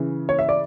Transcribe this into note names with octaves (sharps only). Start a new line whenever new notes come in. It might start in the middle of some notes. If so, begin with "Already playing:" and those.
Already playing: C#3 E3
C#5
E5
D5